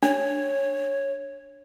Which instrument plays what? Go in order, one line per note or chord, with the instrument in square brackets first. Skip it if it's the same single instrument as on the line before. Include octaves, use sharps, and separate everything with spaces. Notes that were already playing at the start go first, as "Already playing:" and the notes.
[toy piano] D4 [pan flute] C#5